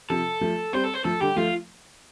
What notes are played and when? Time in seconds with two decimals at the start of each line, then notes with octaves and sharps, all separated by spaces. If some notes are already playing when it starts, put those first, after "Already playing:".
0.10 C3 F3 A4
0.41 F3 A3
0.73 G3 C4 C5
0.84 A4
0.94 C5
1.04 F3 A3 A4
1.21 D3 G3 G4
1.36 F3 A3 F4